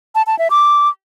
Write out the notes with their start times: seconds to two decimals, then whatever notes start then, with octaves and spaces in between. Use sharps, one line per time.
0.15 A5
0.27 A5
0.39 E5
0.50 D6